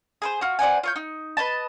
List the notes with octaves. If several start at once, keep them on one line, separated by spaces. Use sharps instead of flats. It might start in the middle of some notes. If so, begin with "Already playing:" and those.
G#4 A#4 C5
F4 F#4
C4 D5 F#5 G#5
F4 C#5 G6
D#4
B4 C#5 D#5 A5